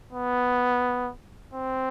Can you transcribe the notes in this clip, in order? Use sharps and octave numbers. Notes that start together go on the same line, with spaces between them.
B3
C4